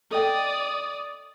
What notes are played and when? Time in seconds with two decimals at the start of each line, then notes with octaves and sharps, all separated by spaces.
0.11 A4 D5 D#5 G5 D#6